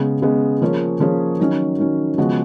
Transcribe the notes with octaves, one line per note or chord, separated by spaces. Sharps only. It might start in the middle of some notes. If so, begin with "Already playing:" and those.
Already playing: C#3 G#3 B3
C#3 G#3 B3
F3 A#3 C#4 G#4 C#5
F3 A#3 C#4 G#4 C#5
D#3 F#3 C#4
D#3 F#3 C#4
C#3 F3 G#3 B3 F#4